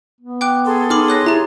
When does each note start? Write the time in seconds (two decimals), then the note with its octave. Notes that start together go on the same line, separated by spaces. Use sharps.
0.20 B3
0.41 G5 D6 F#6
0.65 G#4 A4 C6
0.90 D#4 B5 D6 F6
1.08 C#5 F#6 A#6
1.26 E4 G4 A#5